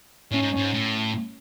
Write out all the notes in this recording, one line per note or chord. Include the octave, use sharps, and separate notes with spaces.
A2 C#4
G#2
G#2
A2